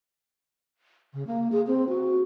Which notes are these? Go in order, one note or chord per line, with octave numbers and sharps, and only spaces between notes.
C#3
A#3
G#4
C4
F#4